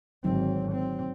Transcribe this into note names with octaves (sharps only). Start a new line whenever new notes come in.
G#1 D3 F#3 C4 D#4
C4